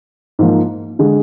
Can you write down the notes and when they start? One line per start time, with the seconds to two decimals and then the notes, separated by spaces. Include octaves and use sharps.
0.39 G#2 F3 A#3
0.99 D3 G#3